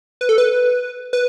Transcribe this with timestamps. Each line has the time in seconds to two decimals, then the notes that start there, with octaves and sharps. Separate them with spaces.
0.21 B4
0.29 A4
0.38 B4
1.13 B4